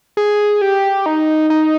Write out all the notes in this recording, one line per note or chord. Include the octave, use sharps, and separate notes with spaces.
G#4
G4
D#4
D#4